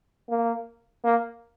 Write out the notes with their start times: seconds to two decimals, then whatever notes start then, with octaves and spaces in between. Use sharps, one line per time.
0.30 A#3
1.04 A#3